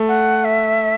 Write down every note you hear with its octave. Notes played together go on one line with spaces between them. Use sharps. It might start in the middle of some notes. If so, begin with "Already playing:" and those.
Already playing: A3
F#5
E5